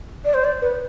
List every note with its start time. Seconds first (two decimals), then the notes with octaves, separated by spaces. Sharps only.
0.25 D5
0.34 C5
0.44 D5
0.62 B4